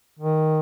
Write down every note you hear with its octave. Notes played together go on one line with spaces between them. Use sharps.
D#3